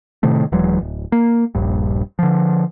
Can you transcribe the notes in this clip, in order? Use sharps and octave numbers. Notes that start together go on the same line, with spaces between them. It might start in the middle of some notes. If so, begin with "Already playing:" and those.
A2 C3 D#3 A3
D#1 E3 F#3 G#3
D1
A#3
D#1 A#1 G2
D3 F3